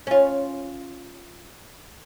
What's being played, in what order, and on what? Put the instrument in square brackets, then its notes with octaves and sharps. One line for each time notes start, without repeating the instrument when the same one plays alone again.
[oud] C#4 F4